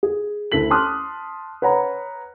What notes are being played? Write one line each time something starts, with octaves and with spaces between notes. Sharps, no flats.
G#4
D2 E4 A4 B6 F#7
A5 C6 D6 D#6 F6 F#6
B4 C#5 F#5 A#5 B5